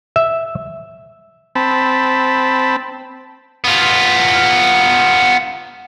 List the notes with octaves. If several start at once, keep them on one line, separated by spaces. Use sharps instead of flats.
E5
C4 A5 B5
B3 F4